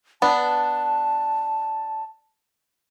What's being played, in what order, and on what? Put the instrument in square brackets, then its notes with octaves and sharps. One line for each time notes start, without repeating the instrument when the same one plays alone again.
[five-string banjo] B3 D4 [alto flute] A5